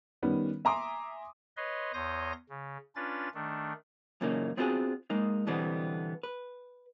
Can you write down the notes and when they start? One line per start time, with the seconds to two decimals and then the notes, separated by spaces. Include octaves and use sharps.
0.22 D#3 G3 B3 C#4
0.65 E5 G#5 A#5 C6 D6 D#6
1.57 B4 C#5 D#5 C6
1.94 E2 C#5 C6 D#6 G6 A#6
2.50 C#3
2.96 C#4 D4 F4 B4 A6
3.34 D#3 A3 D4
4.21 F#2 A#2 C#3 E3 A#3 D#4
4.57 B3 C4 D4 F4 F#4 G#4
5.10 G#3 A#3 D#4
5.47 B2 D3 E3 G3 B3 C4
6.23 B4